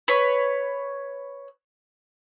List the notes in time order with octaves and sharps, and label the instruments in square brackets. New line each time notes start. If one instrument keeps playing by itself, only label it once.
[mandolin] B4 C#5